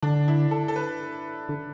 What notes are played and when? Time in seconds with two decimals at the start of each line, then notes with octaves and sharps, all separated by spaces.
0.02 D3 D4
0.28 E4
0.51 A4
0.68 A4
0.76 B4
1.49 D3